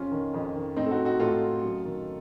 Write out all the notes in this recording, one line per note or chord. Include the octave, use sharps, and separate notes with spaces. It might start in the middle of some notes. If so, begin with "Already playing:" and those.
Already playing: F2 C#4 F4
D#3
F2
D#3
A2 C4 D#4
A4
D#4 F#4
D#4 F#4
A2 F4 A4
F#2
D#3